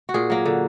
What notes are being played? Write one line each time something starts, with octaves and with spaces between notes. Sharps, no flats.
F#4
A#2 G#4
F#3 A#3
D3